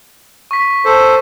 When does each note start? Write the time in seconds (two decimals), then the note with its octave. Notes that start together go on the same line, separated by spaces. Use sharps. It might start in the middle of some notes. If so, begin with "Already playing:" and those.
0.51 C#6 B6
0.85 A4 C5